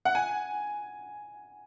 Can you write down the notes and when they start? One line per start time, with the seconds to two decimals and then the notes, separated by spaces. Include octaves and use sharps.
0.05 F#5
0.15 G#5